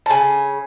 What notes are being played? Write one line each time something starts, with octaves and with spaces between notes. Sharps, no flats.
A5
C#3 G#5